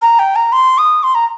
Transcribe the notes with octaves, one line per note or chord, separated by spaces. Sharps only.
A#5
G5
A#5
C6
D#6
C6
A#5